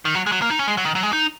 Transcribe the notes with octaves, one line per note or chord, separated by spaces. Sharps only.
D#3
F#3
G#3
F#3
A#3
D#4
C#4
G#3
F#3
D#3
F#3
G#3
D#4